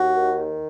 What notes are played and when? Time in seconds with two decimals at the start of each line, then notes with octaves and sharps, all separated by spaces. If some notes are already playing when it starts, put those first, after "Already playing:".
Already playing: D#2 F#4
0.16 D#3